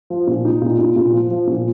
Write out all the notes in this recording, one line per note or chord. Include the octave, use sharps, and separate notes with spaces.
F3
A#2
D#4
A#2
A#2
A#2
F3
F3
A#2